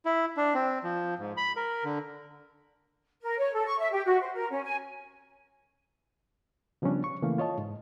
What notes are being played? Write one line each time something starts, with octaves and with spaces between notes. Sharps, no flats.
E4
D4
C4
F3
G#2
B5
A#4
D3
A#4
C#5
A4
C#6
E5
G4
F#4
C5
A#4
C#4
G#5
C#3 F3 G3 B3 C#4 D4
C#6
C#3 E3 A3 A#3 F5
F4 C#5 D#5 A5
G#2